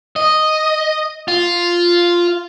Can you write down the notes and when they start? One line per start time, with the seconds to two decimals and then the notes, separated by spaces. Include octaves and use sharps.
0.16 D#5
1.28 F4